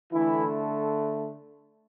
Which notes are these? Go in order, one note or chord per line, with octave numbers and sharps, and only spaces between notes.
D3 E3 A3 E4